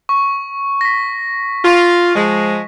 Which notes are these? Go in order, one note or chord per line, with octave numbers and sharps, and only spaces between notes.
C#6
A#6 B6
F4
F3 G#3